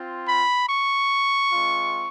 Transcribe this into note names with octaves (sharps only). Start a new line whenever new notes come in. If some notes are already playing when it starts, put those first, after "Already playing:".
Already playing: C4 F4
B5
C#6
G#3 C4 F4